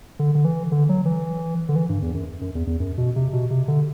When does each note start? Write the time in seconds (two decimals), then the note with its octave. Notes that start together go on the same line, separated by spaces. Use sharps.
0.19 D3
0.35 D3
0.45 E3
0.72 D3
0.89 F#3
1.05 E3
1.69 D3
1.76 E3
1.89 G2
2.02 E2
2.14 F#2
2.41 F#2
2.55 E2
2.67 E2
2.80 F#2
2.98 B2
3.16 C3
3.33 B2
3.50 C3
3.68 D3